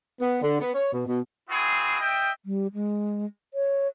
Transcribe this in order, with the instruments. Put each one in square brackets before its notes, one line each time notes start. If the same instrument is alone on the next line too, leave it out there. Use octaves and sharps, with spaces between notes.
[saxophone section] B3
D3
B3
C#5
B2
B2
[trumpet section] C4 E4 F#4 G#4
D#5 E5 G5
[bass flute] G3
G#3
C#5